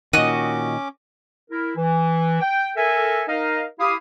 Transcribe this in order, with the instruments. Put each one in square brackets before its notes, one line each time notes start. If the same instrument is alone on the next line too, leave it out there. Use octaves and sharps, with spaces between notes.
[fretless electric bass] A#2 D#3 [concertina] C#4 D6 [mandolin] F#4 D#5 [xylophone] D#7
[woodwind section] E4 A#4
E3
G5
A4 A#4 E5 G#5
D#4 A#4 D#5 F5
E4 G4 F5 D#6